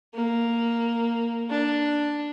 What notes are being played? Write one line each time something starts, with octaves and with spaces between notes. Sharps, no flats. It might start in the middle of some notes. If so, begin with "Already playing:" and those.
A#3
D4